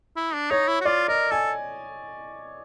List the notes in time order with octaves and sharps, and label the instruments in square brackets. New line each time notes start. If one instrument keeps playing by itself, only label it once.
[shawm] E4
D4
[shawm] D#4 [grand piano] C#5
[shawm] E4
F#4
[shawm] F4 [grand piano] D5
[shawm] A#4 [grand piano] D#5
[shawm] A4 [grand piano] G#5